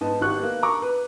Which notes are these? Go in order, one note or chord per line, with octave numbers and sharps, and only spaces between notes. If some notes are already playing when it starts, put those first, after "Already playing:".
G#2 B3 D#5 A5
G#1 D#3 G4 C#6 F#6
A#3 B3
A#5 C#6 D6
B4